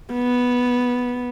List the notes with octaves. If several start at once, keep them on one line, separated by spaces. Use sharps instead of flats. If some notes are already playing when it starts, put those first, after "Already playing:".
B3